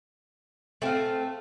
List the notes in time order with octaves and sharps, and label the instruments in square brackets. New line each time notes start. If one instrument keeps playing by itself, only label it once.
[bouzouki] A3 C4 F4